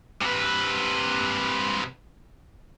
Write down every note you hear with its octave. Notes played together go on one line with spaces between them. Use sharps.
C3 B4